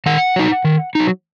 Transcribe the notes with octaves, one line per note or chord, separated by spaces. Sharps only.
D#3 F#5
F#3 D#4
D#3
F#3 D#4